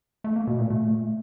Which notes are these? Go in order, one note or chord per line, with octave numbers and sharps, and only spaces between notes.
A3
A#3
B2
A#2
A3